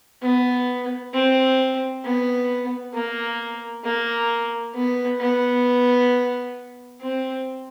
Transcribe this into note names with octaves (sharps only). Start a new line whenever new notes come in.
B3
C4
B3
A#3
A#3
B3
B3
C4